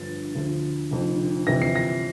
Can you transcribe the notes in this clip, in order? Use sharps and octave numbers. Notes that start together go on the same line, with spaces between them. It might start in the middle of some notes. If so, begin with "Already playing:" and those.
Already playing: G1 G2 D3 F3 A6
D2 D3 F3
F1 F2 D3 F3
G1 F2 C3 E3 A#6
C7
A#6